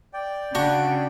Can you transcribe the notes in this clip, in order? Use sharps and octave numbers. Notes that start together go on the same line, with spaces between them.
D5 G5
C#3 D4 F#4